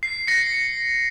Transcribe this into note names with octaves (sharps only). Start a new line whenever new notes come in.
C7
A#6 C#7